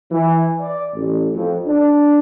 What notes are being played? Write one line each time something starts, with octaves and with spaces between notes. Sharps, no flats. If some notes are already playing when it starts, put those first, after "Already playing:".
E3
D5
A1
F2
D4